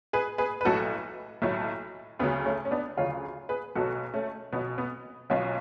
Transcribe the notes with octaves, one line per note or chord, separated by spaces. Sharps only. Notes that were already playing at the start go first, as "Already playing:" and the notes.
G#4 B4
G#4 B4
B4
B1 A2 F#3 F#4 A4
B1 A2 F#3 A3
D2 C#3 F#3 B3
A3 C#4
C#4
B3 D4
D2 C#3 F#3 C#4 F4
G#4 B4
B1 B2 F#3 F#4 A4
A3 C#4
B1 B2 F#3 B3
B3
B1 B2 F#3 C#4 F4